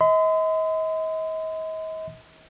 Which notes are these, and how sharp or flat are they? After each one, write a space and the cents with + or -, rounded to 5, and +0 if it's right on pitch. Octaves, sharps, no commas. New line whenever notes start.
D#5 +40 C6 -45